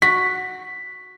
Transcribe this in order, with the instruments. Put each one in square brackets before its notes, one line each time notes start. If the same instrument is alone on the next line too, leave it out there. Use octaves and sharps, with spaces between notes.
[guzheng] F#4 [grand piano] B6